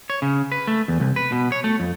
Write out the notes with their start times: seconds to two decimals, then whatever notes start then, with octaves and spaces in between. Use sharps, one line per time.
0.10 C#5
0.22 C#3
0.52 B4
0.67 A3
0.88 E2
1.00 C2
1.16 B4
1.32 B2
1.52 C#5
1.64 A3
1.80 F2